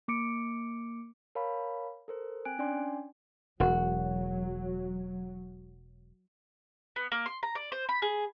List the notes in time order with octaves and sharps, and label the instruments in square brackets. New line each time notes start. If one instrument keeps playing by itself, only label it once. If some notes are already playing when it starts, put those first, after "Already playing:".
[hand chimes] A#3 D6 C#7 D7
A#4 C#5 F5 A5 B5
A4 A#4 C5
C4 G5 G#5 F#6 D7
C#4 D4 D5 G5 G#5 C6
[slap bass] E1 [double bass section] F#3 [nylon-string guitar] F#4
[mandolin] B3
A#3
C6
A#5
D5
C5
B5
G#4